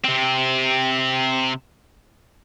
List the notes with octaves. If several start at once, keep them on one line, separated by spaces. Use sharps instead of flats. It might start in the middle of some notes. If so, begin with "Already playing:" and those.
C3 C4